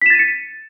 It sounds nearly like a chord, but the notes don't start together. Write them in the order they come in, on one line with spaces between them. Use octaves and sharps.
B6 E7 A6 D#7 C#7